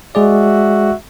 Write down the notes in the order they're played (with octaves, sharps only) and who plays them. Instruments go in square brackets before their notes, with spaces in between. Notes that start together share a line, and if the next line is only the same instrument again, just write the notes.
[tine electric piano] G#3 G#4 D5 [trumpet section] F#4 E5